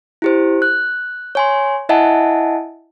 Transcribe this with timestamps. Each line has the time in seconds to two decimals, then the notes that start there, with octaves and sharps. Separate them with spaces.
0.22 E4 G4 C5
0.62 F#6
1.35 C#5 G#5 C6
1.89 E4 D#5 E5 F#5 G#5 A5